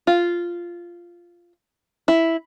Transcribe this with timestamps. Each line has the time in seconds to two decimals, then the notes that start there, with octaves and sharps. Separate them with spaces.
0.07 F4
2.08 E4